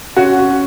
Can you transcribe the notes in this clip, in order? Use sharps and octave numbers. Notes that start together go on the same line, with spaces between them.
C#4 F#4
C#4